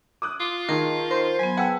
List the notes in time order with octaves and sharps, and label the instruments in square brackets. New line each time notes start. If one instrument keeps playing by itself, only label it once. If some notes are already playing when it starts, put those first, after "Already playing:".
[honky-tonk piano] D6 D#6 F#6
[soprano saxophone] F4
[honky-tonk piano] D#3 [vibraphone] G#4 A#4 A5
[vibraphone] A#4 [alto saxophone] C5
[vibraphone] F#3 B3 [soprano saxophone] G#5
[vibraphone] G#4 B4 A5 [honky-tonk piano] F#5 E6 [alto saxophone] G5